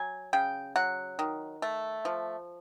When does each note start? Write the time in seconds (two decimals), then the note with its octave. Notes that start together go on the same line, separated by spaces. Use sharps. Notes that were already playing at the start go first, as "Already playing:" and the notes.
Already playing: F#3 G#5
0.33 C#3 G5
0.76 F#3 F#5
1.19 D#3
1.62 A3
2.05 F3